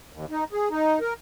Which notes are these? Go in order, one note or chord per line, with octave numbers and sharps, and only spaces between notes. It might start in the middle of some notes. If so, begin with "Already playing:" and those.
D#2
D#4
G#4
D#4
A#4